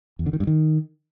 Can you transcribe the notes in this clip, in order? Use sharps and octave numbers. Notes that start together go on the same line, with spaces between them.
E2
D3
D#3
G2
D#3